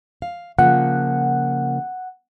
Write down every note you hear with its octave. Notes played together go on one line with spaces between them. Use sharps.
F5
C#3 F3 A#3 F#5